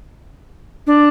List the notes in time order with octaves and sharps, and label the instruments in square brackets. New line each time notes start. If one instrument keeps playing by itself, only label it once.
[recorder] D4